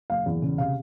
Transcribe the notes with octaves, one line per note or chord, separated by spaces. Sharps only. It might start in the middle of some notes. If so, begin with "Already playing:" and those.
F#1 F5
E2
C#3
C3 F5